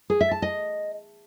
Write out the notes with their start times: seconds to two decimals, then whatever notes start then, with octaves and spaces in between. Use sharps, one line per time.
0.10 G#4
0.21 E5
0.31 A5
0.42 D#5